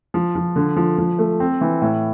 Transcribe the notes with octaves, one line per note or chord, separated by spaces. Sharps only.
F3
F3
D3
F3
F3
A3
C4
E3
A2